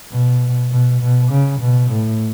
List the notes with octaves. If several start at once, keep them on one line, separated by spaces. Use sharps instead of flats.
B2
B2
B2
C#3
B2
A2